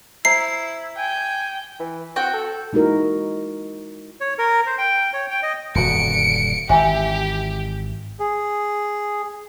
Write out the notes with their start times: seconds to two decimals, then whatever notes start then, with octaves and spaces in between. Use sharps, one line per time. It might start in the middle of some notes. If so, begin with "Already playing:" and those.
0.25 E4 C5 E5 A#5 C7
0.97 G5 G#5
1.80 E3
2.16 C4 F#4 G5
2.33 A4
2.73 G#3 D#4 E4 F#4 A#4
4.21 C#5
4.38 A#4
4.66 C5
4.78 G5
5.13 C#5
5.30 G5
5.43 D#5
5.75 D#1 F#2 D3 B3 F#4 C#7 D7
6.69 G#1 E3 G4 E5 G#5
8.20 G#4